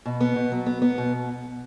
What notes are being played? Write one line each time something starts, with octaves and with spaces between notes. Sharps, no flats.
B2
B3
B2
F#3
B3
B3
B2